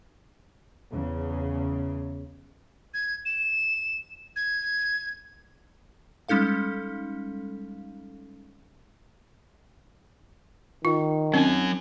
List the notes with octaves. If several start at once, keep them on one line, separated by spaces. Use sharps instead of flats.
E2 C#3
G#6
E7
G#6
G3 G#3 C#4 D#4 A4 F5
D#3 F4
F#3 C4 C#4 G#5